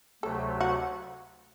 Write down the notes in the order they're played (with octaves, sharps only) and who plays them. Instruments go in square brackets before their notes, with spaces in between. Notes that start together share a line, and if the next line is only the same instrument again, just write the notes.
[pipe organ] D2 C3 F#3 A3 [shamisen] A4
[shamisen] F#4